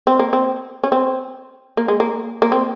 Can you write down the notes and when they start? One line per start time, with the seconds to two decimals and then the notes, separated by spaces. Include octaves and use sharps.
0.07 C4
0.19 A#3
0.33 C4
0.84 C#4
0.92 C4
1.77 A#3
1.88 G#3
2.00 A#3
2.42 A#3
2.52 C4